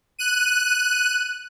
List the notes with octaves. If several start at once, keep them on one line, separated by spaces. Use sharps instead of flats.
F#6 D#7